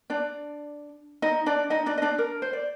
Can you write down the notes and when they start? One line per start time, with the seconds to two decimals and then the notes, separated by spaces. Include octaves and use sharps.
0.10 D4 D5
1.22 D#4 D#5
1.46 D4 D5
1.70 D#4 D#5
1.86 D4 D5
1.98 D#5
2.02 D4 D5
2.18 A#4
2.42 C5
2.53 D5